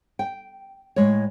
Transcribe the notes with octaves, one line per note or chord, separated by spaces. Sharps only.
G5
A2 G#3 C#5